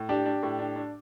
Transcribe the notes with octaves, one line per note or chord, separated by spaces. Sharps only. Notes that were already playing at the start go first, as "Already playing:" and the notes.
Already playing: A2
D4 G4
D4
A2
D4
D4